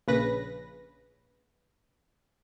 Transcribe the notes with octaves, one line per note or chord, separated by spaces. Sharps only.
A#1 C#3 B4 A#6